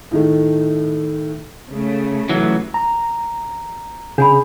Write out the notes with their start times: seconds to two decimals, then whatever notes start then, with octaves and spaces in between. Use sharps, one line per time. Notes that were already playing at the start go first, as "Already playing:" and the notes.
0.11 A2 D#3 A3
1.70 C#3 A3
2.29 E3 F#3
2.74 A#5
4.18 C#3 D4 G#4 G#5 B5